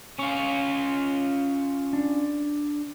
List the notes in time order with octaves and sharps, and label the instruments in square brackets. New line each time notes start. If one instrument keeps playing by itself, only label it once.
[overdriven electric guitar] C#4 F4 [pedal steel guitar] C#6
[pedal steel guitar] D4